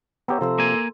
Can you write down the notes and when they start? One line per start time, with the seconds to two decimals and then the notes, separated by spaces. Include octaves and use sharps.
0.28 B3 G4 C#5 A#5 E6
0.41 C3 F3 A4 C6 E6
0.58 A#3 G#5